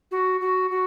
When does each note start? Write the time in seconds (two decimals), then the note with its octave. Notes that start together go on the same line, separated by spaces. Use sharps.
0.11 F#4
0.41 F#4
0.71 F#4